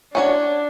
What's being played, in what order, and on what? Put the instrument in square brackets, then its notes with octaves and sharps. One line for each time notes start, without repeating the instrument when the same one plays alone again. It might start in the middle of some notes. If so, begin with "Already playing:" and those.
[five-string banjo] C#4 F#4 C#5 [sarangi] D4